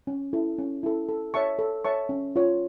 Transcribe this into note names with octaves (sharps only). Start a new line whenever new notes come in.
C#4
E4 A4
C#4
E4 A4
A4
C#5 E5 A5 C#6
A4
C#5 E5 A5 C#6
C#4
F4 C#5